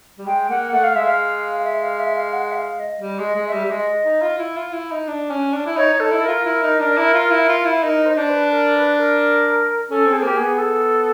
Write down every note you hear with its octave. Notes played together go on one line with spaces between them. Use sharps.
G3
G#3 G5
A#3 F#5
A3 F#5
F5
G#3 E5
F5
E5
F5
E5
F5
F#5
E5
F5
D#5
G3
G#3 D#5
G#3
E5
G3
G3
G#3 D#5
D#4
F4
E4
F4
E4
D#4
D4
C#4
D4
E4
D#4 C#5
D#4
A4
E4
A#4
F4
E4
D#4
D4
E4
F4
E4
F4
E4
D#4 A#4
C5
D#4
D4
B4
A#4
B4
A#4
C#4 A4
C4
G#4
A#3 G4
B3 G#4
A4